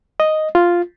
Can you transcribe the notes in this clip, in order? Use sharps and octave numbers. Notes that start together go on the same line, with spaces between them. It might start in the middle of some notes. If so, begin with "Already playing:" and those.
D#5
F4